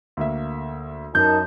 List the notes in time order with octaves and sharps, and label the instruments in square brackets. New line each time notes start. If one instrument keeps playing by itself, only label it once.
[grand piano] D2 A#3 E5
[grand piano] F#2 [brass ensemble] D#4 A#4 A5 [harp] G6